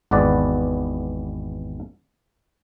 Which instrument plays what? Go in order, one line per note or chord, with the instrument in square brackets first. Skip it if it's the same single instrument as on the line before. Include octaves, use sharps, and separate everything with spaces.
[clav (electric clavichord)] G#1 E2 B3 B4 D5